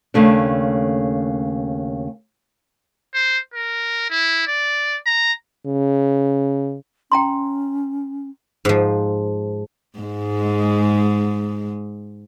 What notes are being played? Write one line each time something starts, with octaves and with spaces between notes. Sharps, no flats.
D#2 C#3 A3 D4
C5
A#4
E4
D5
A#5
C#3
C#4 G5 A#5 C6
G#2 F3
G#2 G#3